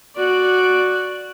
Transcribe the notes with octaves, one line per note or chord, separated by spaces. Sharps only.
F#4 D5